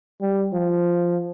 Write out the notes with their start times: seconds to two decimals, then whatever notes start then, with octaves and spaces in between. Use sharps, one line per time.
0.21 G3
0.53 F3